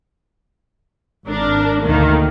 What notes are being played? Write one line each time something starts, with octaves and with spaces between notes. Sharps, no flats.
G#1 D4 A#4
D2 D#3 A#3